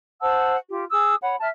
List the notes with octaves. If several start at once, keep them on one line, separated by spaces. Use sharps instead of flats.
C5 F#5 A5 E6
F4 G4
G#4 D#6 E6
C#5 F#5 B5
E5 A5 F6